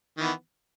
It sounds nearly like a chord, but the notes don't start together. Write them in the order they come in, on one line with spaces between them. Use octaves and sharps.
D#3 E3 B3